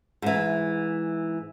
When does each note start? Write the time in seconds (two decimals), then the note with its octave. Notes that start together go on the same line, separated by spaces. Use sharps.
0.22 G#2 E3